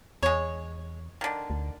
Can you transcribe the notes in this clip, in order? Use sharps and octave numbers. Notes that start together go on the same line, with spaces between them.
E2 G#3 C#5
D3 D#3
D2